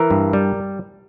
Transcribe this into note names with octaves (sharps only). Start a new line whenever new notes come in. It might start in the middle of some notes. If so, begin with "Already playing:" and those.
Already playing: E3 A#4
G2
G3